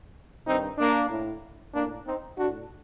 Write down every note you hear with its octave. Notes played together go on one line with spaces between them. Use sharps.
G2 D#3 C4 D#4
A#3 D4
A2
A2 A#3 D4
C4 D#4
A2 D4 F#4